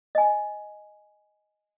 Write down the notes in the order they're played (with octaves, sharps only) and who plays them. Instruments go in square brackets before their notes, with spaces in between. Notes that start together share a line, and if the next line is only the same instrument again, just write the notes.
[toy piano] D#5 G#5